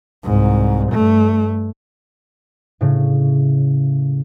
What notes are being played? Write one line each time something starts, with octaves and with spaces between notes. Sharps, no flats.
C2 G#2
G2 A3
A2 C#3